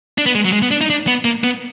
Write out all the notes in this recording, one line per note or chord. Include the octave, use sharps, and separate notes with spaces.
D4
B3
G#3
F#3
G#3
B3
D4
D#4
D4
B3
A#3
B3